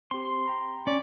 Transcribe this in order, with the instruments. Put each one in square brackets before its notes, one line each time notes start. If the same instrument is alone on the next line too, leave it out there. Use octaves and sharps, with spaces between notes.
[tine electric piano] C4 G4 [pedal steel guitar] C6
[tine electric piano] G5 A#5 B5
[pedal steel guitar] C#4 [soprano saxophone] D5 [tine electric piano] G#5 C#6